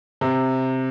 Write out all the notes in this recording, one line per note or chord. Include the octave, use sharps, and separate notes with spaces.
C3